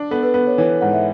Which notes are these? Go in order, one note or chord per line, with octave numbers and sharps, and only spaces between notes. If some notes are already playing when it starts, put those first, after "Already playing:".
Already playing: D4
B3 A4
B4
B3
C#5
E3 C#5
G#2 F#5
E5